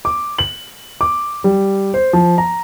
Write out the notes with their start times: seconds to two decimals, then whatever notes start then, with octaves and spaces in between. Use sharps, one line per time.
0.05 D6
0.38 F#7
1.01 D6
1.44 G3
1.94 C5
2.13 F3
2.38 A#5